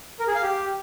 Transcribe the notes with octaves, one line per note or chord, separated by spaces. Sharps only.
A#4
G#4
F5
G4